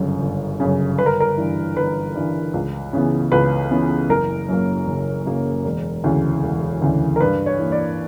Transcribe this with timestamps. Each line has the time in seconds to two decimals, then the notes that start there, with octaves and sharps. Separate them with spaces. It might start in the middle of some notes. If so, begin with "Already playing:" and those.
Already playing: G1 F#2 C#3
0.21 G1
0.60 F#2 C#3
0.98 G1 B4
1.06 A#4
1.20 A#4
1.37 G2 E3
1.76 G1 B4
2.15 G2 E3
2.54 C#2
2.93 C#3 E3 B3
3.32 C#2 B4
3.71 C#3 E3 B3
4.10 F#1 A#4
4.49 F#2 C#3 F#3 A#3
4.87 F#1
5.26 F#2 C#3 F#3 A#3
5.65 E1
6.04 D2 C#3 E3
6.43 E1
6.82 D2 C#3 E3
7.16 A#4
7.20 G2 B4
7.46 C#5
7.59 E3 A#3
7.72 D5